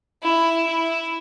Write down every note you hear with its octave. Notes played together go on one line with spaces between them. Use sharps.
E4
E4